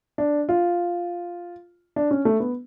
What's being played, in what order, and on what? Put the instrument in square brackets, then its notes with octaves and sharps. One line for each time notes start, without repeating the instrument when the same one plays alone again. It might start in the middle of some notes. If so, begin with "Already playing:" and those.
[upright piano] D4
F4
D4
C#4
A3
B3